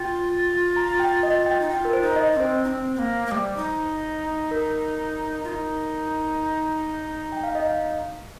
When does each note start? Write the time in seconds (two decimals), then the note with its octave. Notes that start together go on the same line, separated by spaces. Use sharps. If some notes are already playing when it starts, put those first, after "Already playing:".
Already playing: F4 G5
0.76 A#5
1.00 G5
1.23 D#5
1.46 G5
1.61 D#4
1.70 F4 G5
1.85 A#4
1.93 C5
2.01 D#4
2.16 D#5
2.32 D#4
2.37 C4 C5
2.64 D#4
2.67 C4
2.95 C4
2.99 A#3
3.27 A#3
3.31 G3
3.57 D#4
4.51 A#4
5.44 F4
5.49 D#4
7.32 G5
7.43 F5
7.55 D#5
7.66 F5